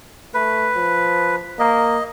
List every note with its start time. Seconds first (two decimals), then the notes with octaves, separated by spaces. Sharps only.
0.34 A3 B4
0.76 F3
1.59 A#3 D#5